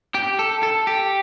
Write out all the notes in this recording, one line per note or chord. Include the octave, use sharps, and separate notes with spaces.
G4
A4
A4
G4